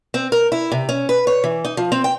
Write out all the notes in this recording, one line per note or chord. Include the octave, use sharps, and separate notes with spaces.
C4
A#4
E4
C3
C#4
B4
C#5
E3
D#4
F3
C4
G5